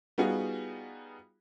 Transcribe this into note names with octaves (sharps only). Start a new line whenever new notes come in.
G3 B3 D#4 F4 F#4 G#4